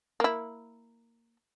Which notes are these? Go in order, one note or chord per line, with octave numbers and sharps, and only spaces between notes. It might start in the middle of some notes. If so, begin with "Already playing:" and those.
A#3 E4